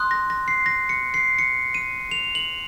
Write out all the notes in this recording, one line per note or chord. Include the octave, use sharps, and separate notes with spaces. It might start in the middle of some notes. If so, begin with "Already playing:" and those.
Already playing: C6 D#6 F#6
A#6
A#6
C7
A#6
C#7
C7
C#7
D#7
F7
F#7